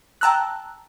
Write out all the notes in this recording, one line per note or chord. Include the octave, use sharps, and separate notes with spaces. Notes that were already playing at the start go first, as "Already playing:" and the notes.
G5 A5 A#5 E6 F#6